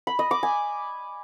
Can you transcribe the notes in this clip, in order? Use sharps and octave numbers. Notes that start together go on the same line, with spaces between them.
B5
D#5
D6
G#5